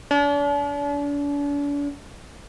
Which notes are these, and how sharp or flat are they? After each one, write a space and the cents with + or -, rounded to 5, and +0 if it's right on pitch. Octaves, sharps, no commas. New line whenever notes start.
D4 -40